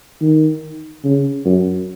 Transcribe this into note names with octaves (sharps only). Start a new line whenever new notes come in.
D#3
C#3
F#2